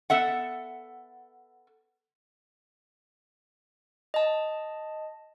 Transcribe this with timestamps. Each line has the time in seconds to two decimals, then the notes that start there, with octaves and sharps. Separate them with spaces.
0.10 B3 A4 E5 F#5
4.14 D#5 A5